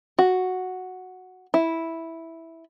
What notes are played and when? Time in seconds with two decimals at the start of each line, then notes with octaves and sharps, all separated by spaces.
0.19 F#4
1.54 E4